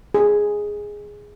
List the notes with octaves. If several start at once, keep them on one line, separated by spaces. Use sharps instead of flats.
G#4